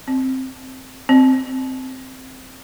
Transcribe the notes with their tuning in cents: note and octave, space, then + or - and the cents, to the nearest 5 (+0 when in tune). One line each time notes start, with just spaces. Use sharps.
C4 +0
C4 -5